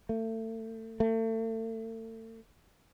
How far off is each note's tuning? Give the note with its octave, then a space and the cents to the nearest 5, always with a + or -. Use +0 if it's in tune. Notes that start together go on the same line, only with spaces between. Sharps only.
A3 +30
A3 +35